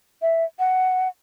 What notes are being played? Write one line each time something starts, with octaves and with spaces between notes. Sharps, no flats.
E5
F#5